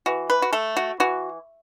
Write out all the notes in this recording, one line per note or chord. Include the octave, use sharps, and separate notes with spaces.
E3 F#4
B4
F#4
A3 A4
F#4
E3 F#4